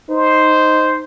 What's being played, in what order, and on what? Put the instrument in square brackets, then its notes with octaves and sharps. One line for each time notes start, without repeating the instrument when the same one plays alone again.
[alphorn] D#4 [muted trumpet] C5